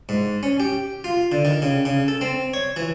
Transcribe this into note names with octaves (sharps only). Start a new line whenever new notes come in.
G#2
C#4
G4
F4
D3
D#3
C#3
C#3
A4
C4
C#5
E3